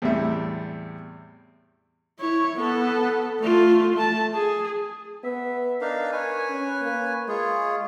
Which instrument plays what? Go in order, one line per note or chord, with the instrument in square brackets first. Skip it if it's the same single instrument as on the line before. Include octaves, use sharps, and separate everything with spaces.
[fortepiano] E2 A2 C3 G3 E5
[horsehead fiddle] E4 C#5
B3 A4
A3 F4
A3 A5
G#4
[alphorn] B3 [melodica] E5
[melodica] D4 D#4 F5 [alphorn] A#4
[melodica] B4 C#5 G#5
[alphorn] C#4
A#3
[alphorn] G#3 [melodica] F4 G#4 C#5